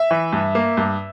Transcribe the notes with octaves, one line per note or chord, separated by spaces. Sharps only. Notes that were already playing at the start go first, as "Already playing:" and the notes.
Already playing: E5
E3
G2
A#3
G2